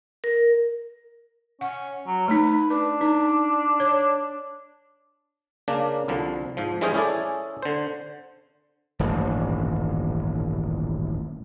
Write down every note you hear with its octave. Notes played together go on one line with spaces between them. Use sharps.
A#4
C#4 F#5
F#3
A3 D#4 B4
D4 B4
D#4
C#5
C#3 A#3 D4
C2 D3 F3
G#2 F3
E3 G3 G#3 C#4 G#4 C5
C#4 E4 G#4 A4 D5
D3 C5
D#1 A1 G2